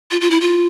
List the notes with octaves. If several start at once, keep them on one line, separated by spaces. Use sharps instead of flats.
F4
F4
E4
F4